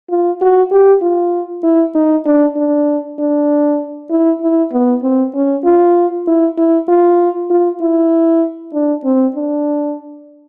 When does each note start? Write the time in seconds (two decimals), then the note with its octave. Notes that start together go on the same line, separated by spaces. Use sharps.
0.10 F4
0.41 F#4
0.71 G4
1.02 F4
1.64 E4
1.95 D#4
2.26 D4
2.56 D4
3.19 D4
4.10 E4
4.42 E4
4.72 B3
5.03 C4
5.35 C#4
5.64 F4
6.27 E4
6.57 E4
6.88 F4
7.50 F4
7.81 E4
8.73 D4
9.05 C4
9.35 D4